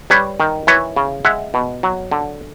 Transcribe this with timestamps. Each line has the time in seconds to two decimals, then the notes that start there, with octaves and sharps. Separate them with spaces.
0.10 G3 B4 C#5
0.40 D#3
0.67 E3 B4 C#5
0.96 C#3
1.25 G#3 E5 F#5
1.54 B2
1.83 F#3
2.11 D3